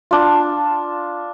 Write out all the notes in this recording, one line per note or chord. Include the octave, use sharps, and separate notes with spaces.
D4 F4